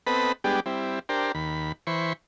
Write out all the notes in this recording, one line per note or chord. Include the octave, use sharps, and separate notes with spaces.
B3 C4 A4 B4 D#5 B5
G3 G#3 B3 D4 G4
G3 C4 E4
D4 G4 A#4 C5
D#2 B5
E3 C5 B5 C#6